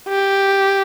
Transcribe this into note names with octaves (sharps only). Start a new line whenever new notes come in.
G4